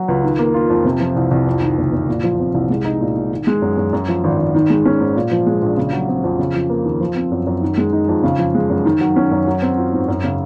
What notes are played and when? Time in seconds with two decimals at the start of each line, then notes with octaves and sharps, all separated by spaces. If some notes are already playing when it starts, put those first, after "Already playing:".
Already playing: F#3
0.08 C#2
0.24 D#3
0.39 A#3
0.54 F4
0.70 F2
0.85 C3
1.00 F3
1.16 C2
1.31 C2
1.47 F2
1.62 D#3
1.77 F#1
1.92 F#1
2.08 A#2
2.23 F3
2.39 C4
2.54 C2
2.70 G#3
2.85 D#4
3.00 A#2
3.16 A#2
3.31 D#3
3.47 G#3
3.62 F#2
3.77 F#2
3.93 F#2
4.08 F3
4.24 G#1
4.39 G#1
4.55 D#3
4.70 G#3
4.85 C#4
5.00 G#2
5.16 A#2
5.31 F3
5.46 G#3
5.62 A#1
5.77 C#3
5.93 F#3
6.08 C4
6.24 F2
6.39 C#3
6.55 F3
6.70 A#3
6.85 D#2
7.00 F3
7.16 C4
7.32 F#2
7.47 F#2
7.62 D#3
7.78 G#3
7.93 D#4
8.08 F2
8.23 C#3
8.39 F3
8.55 G#3
8.70 F#2
8.85 D#3
9.01 F#3
9.16 C#4
9.31 F#2
9.47 F#3
9.62 C4
9.77 F4
9.93 G#2
10.08 F#2
10.24 C#3